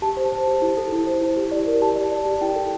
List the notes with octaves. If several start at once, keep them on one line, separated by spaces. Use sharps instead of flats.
G4 A5
C5
C5
G4
E4
A4
E4
C5
E4
G4
D5
A#4
G4 A5
D5
D5
G4
E4 G5
A4